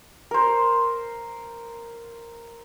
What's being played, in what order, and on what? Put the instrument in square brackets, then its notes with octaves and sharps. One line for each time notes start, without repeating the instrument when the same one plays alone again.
[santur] A#4 C5